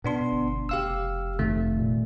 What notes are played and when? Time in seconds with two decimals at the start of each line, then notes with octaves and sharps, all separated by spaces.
0.04 B2 B3 D4 C6
0.32 G1
0.69 F1 G4 F5 E6
1.39 F2 C3 D#3 A3
1.78 A#2